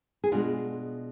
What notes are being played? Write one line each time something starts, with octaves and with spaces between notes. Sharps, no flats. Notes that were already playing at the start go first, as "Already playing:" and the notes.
G#4
B2 G#3 D4 F4